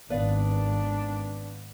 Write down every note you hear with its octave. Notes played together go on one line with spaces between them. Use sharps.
G#1 B3 D4 B4 D5 F5